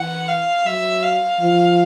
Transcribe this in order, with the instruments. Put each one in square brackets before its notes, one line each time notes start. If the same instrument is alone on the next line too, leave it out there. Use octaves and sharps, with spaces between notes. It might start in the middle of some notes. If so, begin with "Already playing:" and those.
Already playing: [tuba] E3 [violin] F#5
[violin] F5
[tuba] F#3 [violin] E5
[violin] F5
[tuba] F3